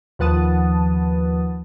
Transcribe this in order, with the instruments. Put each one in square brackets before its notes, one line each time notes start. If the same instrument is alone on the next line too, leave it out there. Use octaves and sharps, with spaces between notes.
[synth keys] D#2 F3 B4 F#5 A5 D#6